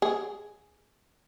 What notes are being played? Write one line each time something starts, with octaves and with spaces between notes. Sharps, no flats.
G#4